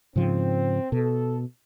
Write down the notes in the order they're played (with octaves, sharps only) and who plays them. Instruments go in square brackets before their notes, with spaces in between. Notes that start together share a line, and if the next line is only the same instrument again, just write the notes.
[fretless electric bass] G#2 C#3 F3 [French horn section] C4
[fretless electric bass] B2 [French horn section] A4